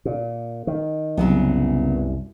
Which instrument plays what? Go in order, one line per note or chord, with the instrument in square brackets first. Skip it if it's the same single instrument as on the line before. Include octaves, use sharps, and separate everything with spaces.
[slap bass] A#2
D#3
[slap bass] C2 F#2 [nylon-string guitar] C#3 F#3 B3